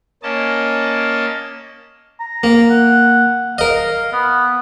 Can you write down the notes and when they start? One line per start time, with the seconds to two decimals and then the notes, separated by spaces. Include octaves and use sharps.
0.23 A#3 C#4 D#5 A5
2.20 A#5
2.43 A#3
2.70 F#5
3.58 A#4 D#5 F5
4.12 B3